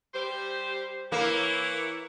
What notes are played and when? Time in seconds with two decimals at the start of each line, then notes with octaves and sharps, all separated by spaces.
0.14 G3 G4 C5
1.12 E3 A#3 E4 C#5